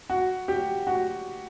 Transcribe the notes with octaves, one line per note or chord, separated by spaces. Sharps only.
F#4
G4
F#4